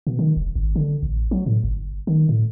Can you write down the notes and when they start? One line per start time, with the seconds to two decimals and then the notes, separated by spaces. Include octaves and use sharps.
0.07 B2
0.19 D#3
0.37 F1
0.56 G#1
0.76 D3
1.03 A1
1.31 F#3
1.46 A2
1.64 G1
2.07 D#3
2.29 A2